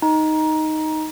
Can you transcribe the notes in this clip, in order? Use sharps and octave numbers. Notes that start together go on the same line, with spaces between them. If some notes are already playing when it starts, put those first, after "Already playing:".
D#4